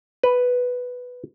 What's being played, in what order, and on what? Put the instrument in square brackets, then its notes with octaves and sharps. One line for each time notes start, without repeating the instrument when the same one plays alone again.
[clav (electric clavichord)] B4